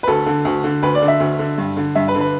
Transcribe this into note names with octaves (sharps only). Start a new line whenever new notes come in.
B4
D2 A4
D3
D2
D3
D2 B4
D5
D3
E5
D2
D3
G2
D3
G2 E5
B4
D3
B4